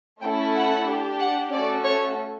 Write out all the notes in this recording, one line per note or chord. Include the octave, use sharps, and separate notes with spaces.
A3 C#4 E4 A4 G5
F#5
D4 G4
F#5
A3 C#4 F#4 A4 D5
C#5